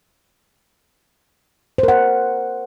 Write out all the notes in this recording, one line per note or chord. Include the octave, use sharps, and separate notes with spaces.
A#4 C5 F#5